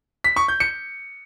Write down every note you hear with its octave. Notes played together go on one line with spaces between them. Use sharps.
B6
C#6
G6
C#7